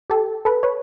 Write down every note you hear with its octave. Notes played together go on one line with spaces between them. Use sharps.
G4 A4
A4 B4
B4 C#5